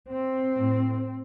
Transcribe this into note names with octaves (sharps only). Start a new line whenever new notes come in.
C4
A2